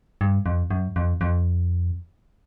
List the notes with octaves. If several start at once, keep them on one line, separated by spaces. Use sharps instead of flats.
G2
F2
F#2
F2
F2